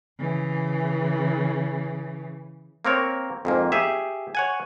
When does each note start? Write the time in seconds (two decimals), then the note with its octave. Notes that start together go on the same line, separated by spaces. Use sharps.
0.19 C#3 E3
2.85 A#3 C4 A#4 C#5
3.45 F2 G#2 A#3
3.72 G4 G#4 E5
4.35 C#5 F#5 G#5